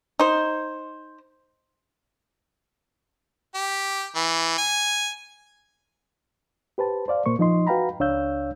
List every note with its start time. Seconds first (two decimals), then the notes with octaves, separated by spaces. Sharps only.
0.20 D#4 C5
3.55 G4
4.16 E3
4.58 G#5
6.78 G4 B4 C5 A5
7.08 C5 D5 F5
7.26 A#2 A#3 C5 C#6
7.39 F3 D#4 D#5 C6
7.67 F#4 B4 F5 G5 A#5 B5
8.00 C#2 D4 C#5 F5 E6 G6